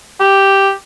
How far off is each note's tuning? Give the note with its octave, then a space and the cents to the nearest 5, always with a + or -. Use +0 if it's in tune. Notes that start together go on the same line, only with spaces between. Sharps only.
G4 +0